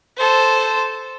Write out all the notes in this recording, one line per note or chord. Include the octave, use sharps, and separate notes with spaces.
A4 C5